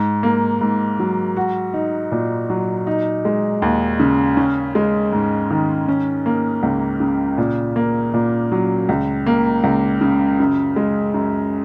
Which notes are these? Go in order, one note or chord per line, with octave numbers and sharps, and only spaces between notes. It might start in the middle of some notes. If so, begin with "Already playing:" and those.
Already playing: G#2
A#3
G#2
F#3
F#4
D#4
A#2
F#3
D#4
G#3
D#2
C#3
C#4
G#3
G#2
D#3
C#4
A#3
C#2
C#3
A#2
A#3
A#2
F#3
C#2
A#3
C#2
C#3
F#2
G#3
F#2